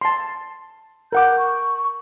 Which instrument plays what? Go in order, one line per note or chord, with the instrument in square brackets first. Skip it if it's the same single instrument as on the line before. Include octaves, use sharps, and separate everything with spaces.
[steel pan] A5 C6
[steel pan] A#4 F#5 D6 [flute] G6
[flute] C#6